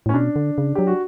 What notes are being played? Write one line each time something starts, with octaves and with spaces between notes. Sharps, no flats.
A2
C#4
B2 D4
D3
C#3
F#3 G4
F#4